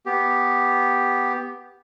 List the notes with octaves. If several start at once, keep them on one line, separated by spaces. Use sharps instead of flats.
B3 G4